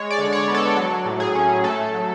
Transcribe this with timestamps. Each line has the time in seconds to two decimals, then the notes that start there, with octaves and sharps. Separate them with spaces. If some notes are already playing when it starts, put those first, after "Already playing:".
Already playing: G#3 C#5
0.10 D5
0.18 D3
0.33 C#5
0.48 B3
0.54 A4
0.76 F#3
1.05 A2
1.20 G#4
1.35 C#4
1.64 A3 A4
1.94 F#3